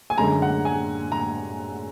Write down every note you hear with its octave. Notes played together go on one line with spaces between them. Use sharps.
G#5
F#2 D3 G#3 A#5
F#5
G#5
A#5